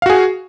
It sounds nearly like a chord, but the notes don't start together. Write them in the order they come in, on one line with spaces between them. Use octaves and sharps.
F5 F#4 G#4